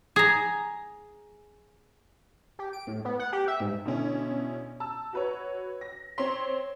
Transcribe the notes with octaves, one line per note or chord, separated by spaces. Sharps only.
G#4 A#5
G4
D7
A2
B3
F#5
G4
E5
G#2
B2 D3 C#4 E4
A5 E6
F#4 B4 C#5
A#6
C4 C#5 C6 B6